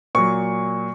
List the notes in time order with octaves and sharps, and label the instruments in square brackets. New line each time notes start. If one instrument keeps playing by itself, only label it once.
[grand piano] A#2 F#3 C#6